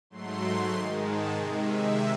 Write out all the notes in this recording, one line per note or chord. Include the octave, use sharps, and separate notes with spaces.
G#2 F#3 A3 C6
G#2 D#3 G#3 C6
A5
C3 D#3 G#3 G#5
E5